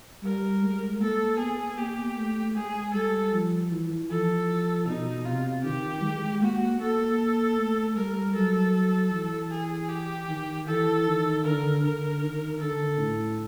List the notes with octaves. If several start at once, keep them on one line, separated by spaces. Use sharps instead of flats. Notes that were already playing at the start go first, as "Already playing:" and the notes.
G3 A#4
G#3
A#3 A4
B3 G#4
A#3 G4
A3
G#3 G#4
G3 A4
F3
E3
F3 A4
B2 D#4
C3 F4
D#3 G4
G#3
A#3 F#4
A#3 A4
A3
G3 A#4
F#3 A4
E3
G#4
G4
D#3
E3 A4
D#3
D3 A#4
D3 A#4
D#3
D3 A4
A2